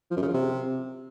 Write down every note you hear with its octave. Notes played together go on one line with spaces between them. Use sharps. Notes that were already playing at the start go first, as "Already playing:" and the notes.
F3
F#2
C#3
F3
C3